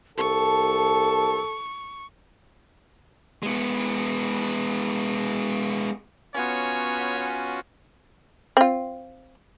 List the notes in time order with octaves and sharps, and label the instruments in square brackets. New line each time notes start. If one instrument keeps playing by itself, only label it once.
[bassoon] C2 [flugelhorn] A4 [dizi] A5 [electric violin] C#6
[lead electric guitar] G#3 B3
[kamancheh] B3 [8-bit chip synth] C#4 F4 F#4 [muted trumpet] C#5 [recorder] G#5
[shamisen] C4 F4